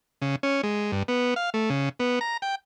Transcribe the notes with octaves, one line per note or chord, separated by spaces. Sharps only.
C#3
C#4
G#3
G2
B3
F5
A3
C#3
B3
A#5
G5